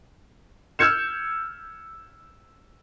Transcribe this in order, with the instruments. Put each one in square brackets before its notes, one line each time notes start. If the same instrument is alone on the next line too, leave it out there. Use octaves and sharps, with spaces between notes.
[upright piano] E6 F6 G6 G#6 C#7 E7